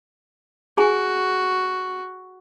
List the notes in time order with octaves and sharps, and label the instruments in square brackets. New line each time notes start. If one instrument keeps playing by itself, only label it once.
[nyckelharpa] F#4 [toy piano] G#4 G#5